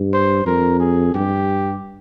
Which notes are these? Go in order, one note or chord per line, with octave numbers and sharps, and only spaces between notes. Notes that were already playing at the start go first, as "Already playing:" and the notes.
Already playing: G2
C5
F2 A#4
G#4
G2 G4